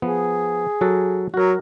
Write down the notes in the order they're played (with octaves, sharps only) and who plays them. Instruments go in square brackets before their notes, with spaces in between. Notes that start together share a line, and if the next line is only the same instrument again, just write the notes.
[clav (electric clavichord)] F3 B3 [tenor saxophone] G#4
[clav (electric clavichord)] F#3 F#4 A4
[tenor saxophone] F#3 [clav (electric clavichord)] F#4 A#4